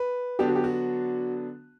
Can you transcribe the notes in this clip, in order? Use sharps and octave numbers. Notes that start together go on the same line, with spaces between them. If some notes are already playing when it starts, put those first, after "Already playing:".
Already playing: B4
D3 F#3 B3 D4 G4
F#4
G4
F#4